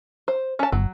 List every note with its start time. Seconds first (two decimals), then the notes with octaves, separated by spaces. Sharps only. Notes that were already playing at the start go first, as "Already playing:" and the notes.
0.28 C5
0.59 C#4 A5
0.72 G1 F#3